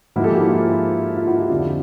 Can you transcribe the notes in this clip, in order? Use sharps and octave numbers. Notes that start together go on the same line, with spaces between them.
G#2 F3 A#3 E4 F#4
G4 A4
F#4 G#4
E4
F4
F4
E4 F#4
F4 G4
F2 D3 F3